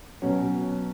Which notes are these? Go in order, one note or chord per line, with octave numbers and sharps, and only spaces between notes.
B2 F#3 C#4